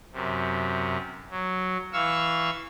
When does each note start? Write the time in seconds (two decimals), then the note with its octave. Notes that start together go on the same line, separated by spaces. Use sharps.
0.13 F#2 C3
1.30 F#3
1.93 E3 F5 C#6 E6